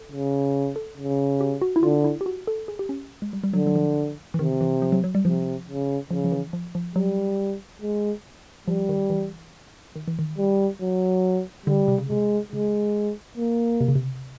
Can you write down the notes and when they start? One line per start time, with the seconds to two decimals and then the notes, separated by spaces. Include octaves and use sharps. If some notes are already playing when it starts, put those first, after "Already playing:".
Already playing: A4
0.12 C#3
0.76 A4
0.97 C#3
1.41 G4
1.62 F#4
1.76 E4
1.82 D3 F4
2.04 E4
2.21 G4
2.26 F#4
2.47 A4
2.68 G#4
2.79 G4
2.89 C#4
3.22 G#3
3.33 G3
3.44 G3
3.53 D3 F#3
3.67 F#3
3.76 F3
4.34 E3
4.39 C3 D#3
4.61 E3
4.82 F3
4.92 F#3
5.04 F#3
5.15 G3
5.25 C3 F3
5.68 C#3
6.11 C#3 F3
6.25 F3
6.32 E3
6.53 F3
6.75 F3
6.96 F#3 G3
7.82 G#3
8.67 F3 G3
8.89 D#3
9.10 E3
9.96 D#3
10.08 E3
10.19 D#3
10.38 G3
10.81 F#3
11.66 D3 G3
11.88 C3
11.98 C#3
12.09 C3 G#3
12.52 C#3 G#3
13.38 A#3
13.81 C3
13.88 C#3
13.95 C3